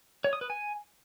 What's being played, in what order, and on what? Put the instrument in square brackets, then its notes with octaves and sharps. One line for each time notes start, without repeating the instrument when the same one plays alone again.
[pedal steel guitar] C#5
D#6
B4
G#5